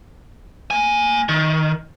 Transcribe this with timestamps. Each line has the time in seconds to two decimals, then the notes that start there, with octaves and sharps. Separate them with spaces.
0.71 A#3 G#5
1.29 D#3